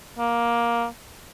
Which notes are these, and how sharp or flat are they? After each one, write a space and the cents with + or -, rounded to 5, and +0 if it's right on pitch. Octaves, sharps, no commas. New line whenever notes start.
A#3 +10